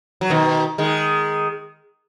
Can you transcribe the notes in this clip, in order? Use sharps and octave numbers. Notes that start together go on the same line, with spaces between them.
F#3
B2 D#3
D#3 G#3